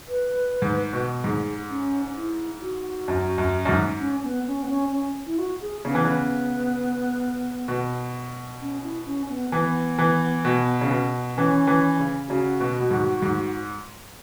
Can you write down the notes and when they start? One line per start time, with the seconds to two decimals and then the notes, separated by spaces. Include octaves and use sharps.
0.09 B4
0.62 G#2
0.93 B2
1.24 G#2 G#4
1.70 C#4
2.16 E4
2.62 F#4
3.08 F#2
3.38 F#2
3.65 F#2
3.69 G#2
4.00 C#4
4.23 B3
4.47 C#4
4.63 B3
4.68 C#4
4.92 C#4
5.27 E4
5.39 F#4
5.61 G#4
5.85 C#3 B3
5.95 E3
6.05 C#3
7.68 B2
8.61 C#4
8.83 E4
9.06 C#4
9.29 B3
9.52 E3 B3
9.99 E3
10.45 B2
10.81 C#3
10.91 B2
11.37 E3 C#4
11.67 E3
11.98 C#3
12.29 C#3 F#4
12.60 B2
12.80 B2
12.91 G#2
13.22 G#2